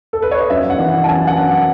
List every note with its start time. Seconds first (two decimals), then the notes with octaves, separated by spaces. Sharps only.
0.13 A4
0.22 B4
0.31 C#5
0.40 D#5
0.50 F#2 E5
0.70 F#5
0.79 E3
1.04 A5
1.08 F#2 G#5
1.27 F#5
1.37 F#2